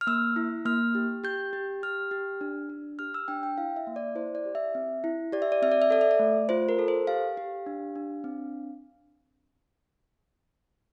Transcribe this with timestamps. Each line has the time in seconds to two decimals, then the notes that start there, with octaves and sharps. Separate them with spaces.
0.01 F6
0.07 A#3 E6
0.36 E4
0.65 A#3 F6
0.95 G4
1.24 G4 G6
1.53 G4
1.83 G4 F6
2.11 G4
2.41 D4
2.69 D4
2.99 G4 F6
3.14 E6
3.28 D4 G5
3.43 G5
3.58 E4 F5
3.76 E5
3.87 A#3
3.96 D5
4.15 E4 C5
4.35 D5
4.46 G4
4.55 E5
4.75 C4
5.04 E4
5.32 G4 D5
5.42 E5
5.52 D5
5.62 C4 E5
5.72 D5
5.82 E5
5.90 A4 D5
6.01 E5
6.11 D5
6.19 A3
6.49 F4 C5
6.69 A#4
6.79 A4
6.88 C5
7.07 G4 F5
7.37 G4
7.66 D4
7.96 D4
8.24 C4